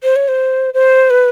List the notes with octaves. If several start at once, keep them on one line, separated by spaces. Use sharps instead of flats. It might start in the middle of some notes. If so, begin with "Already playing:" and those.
C5
C#5
C5
C5
B4